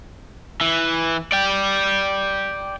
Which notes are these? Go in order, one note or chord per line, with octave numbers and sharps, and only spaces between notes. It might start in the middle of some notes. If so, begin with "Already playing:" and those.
E3
D5 G5